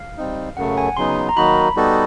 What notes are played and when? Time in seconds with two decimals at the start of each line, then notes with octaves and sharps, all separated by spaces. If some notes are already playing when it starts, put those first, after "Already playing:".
Already playing: F5
0.18 G3 C4 D#4
0.57 F#2 C#3 F#3 A3 F#5
0.77 G#5
0.97 C#3 F#3 B3 D#4 C6
1.29 A#5
1.37 D#3 F#3 A#3 D#4 F#4 B5
1.76 G3 B3 D#4 F#4 A4